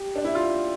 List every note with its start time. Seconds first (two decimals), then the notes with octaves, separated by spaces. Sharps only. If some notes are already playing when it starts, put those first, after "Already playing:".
Already playing: G4
0.16 D4
0.25 E4
0.35 F4